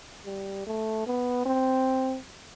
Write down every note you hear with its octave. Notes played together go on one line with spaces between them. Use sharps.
G3
A3
B3
C4